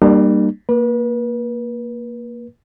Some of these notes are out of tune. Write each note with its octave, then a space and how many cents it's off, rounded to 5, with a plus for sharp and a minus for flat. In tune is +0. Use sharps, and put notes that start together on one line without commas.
G3 +0 A#3 -10 D4 +45
A#3 +0 B4 -35